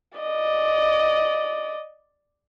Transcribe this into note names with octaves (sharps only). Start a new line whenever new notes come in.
D5 D#5